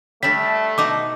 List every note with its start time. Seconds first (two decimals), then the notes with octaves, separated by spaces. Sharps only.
0.23 G3 A3 D4 B6
0.78 B2 D#4 F#5 D6